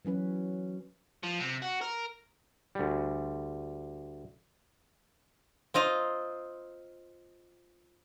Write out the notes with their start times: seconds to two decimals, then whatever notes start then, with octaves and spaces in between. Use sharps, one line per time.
0.05 E3 F#3 C#4 B4
1.23 F3
1.40 C3
1.62 F#4
1.82 A#4
2.75 D2 G3
5.74 C4 F4 D#5 A#5